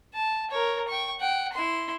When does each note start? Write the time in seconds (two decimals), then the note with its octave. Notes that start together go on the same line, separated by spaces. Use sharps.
0.15 A5
0.51 A#4 C#5
0.88 G5 C#6
1.19 F#5 G5
1.53 E4 C6